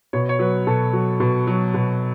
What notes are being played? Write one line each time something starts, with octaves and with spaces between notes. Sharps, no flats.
B2 C#5
C#5
F#3 B4
B2 A4
F#3
B2
F#3
B2